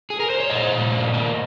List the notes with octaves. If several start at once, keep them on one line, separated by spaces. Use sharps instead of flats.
G#4
A#4
C5
C#5
A#2 C5 D#5
A#2
A#3
A#3